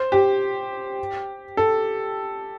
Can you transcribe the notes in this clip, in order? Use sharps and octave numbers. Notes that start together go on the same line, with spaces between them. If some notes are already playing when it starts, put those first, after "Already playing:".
Already playing: C5
G4
A4